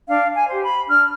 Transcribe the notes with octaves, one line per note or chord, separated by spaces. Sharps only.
D4 F5
G#5
G4 C5
B5
D4 F6